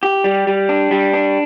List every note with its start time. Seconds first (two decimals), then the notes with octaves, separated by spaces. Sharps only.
0.03 G4
0.24 G3
0.47 G3
0.69 D4
0.91 G3
1.13 D4